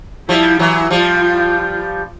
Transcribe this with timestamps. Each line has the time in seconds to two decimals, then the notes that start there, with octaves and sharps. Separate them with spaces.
0.29 F3 G3 E4
0.59 E3 F#3 E4
0.90 F3 G3 F4